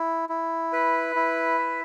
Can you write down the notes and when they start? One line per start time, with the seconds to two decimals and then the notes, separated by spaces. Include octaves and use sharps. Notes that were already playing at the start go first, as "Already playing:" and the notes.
Already playing: E4
0.29 E4
0.73 B4
1.16 E4
1.58 E5